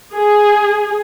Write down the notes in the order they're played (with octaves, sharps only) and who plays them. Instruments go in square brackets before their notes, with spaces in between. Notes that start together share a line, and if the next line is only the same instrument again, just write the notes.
[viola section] G#4